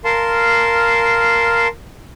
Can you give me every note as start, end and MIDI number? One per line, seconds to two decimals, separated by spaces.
0.05 1.68 70
0.05 1.68 77
0.05 1.68 81
0.05 1.68 84